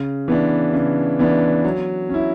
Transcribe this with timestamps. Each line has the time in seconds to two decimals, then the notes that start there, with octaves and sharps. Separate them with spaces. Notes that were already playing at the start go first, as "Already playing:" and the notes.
Already playing: C#3
0.28 E3 B3 D4
0.73 C#3
1.19 E3 B3 D4
1.64 F#3
2.09 C#4 E4